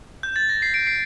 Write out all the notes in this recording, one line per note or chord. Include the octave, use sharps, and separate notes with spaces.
G6
A6
A#6
C7
D7
C7